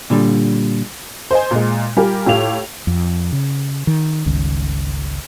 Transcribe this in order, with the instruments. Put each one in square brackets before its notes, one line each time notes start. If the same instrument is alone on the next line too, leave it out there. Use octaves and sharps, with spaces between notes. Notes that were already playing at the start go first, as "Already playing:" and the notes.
[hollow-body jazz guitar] A#2 D3 G3
[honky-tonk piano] C5 D#5 G#5
A#2 G#3
G3 F4 G4 A#4 G#5
A2 F4 G4 F5 F7
[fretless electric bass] F2
C#3
D#3
G1 C#2 D#3